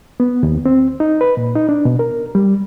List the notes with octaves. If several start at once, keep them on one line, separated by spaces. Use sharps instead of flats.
B3
D#2
C4
D#4
B4
A#2
D#4
D4
B2
A#4
G3